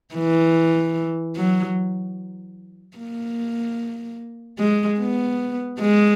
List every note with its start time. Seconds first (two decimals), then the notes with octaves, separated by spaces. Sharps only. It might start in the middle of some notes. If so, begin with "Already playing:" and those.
0.15 E3
1.36 F#3
2.98 A#3
4.59 G#3
5.00 B3
5.80 G#3